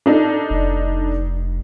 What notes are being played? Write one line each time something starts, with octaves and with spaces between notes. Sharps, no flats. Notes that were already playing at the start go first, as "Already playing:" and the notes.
D4 D#4 A4
F1